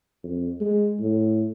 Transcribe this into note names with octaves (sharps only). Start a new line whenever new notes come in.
F2
G#3
A2